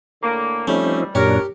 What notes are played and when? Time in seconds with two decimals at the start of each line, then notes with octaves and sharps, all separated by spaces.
0.22 A2 D3 A#3
0.67 F3 G3 A3 C4 C#4 D#4
1.15 F#2 A#2 D4 G4 A#4 C#5